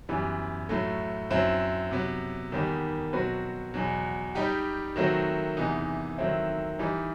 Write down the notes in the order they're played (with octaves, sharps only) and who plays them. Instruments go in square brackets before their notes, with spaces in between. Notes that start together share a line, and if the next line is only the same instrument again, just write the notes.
[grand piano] F#2 E3 G3 B3
A2 F#3 A3
F#2 F#3 C4 E4
C3 F#3 B3
E2 D#3 G3 B3
B2 F#3 C4 F#4 B4
E2 B2 F#3
G3 D#4 G4
D#3 F#3 A3 C4 F#4
E2 C3 E3 B3 D#4
D#3 F#3 A3 C4 E4
E3 G3 D#4